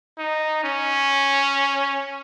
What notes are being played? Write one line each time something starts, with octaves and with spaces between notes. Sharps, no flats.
D#4
C#4